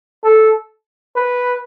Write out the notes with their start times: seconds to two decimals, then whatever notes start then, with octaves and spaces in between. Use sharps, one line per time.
0.24 A4
1.16 B4